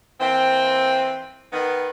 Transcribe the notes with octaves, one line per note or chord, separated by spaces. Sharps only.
E3 A#3 C4
D#3 B3